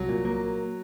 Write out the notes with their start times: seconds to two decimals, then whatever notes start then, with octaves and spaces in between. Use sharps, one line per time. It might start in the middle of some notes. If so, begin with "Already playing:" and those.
Already playing: C2 F#3
0.09 A#2
0.25 A#3